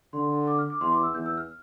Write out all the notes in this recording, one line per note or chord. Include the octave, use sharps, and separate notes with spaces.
D3 C6
D6
F6
D6
E2 C6
D6
E6
E2 G6
E6
F6